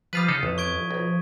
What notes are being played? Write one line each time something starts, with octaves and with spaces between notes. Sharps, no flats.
F3 G3 F4 B4 D#6 B6 D#7
C#3 D#4 F4 A4
A1 F2
C#6 G#6 D7
F3
B1